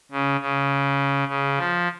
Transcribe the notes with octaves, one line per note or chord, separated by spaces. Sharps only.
C#3
C#3
C#3
F3